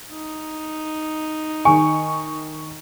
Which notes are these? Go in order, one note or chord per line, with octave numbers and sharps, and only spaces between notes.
D#4
D#3 G#5 C#6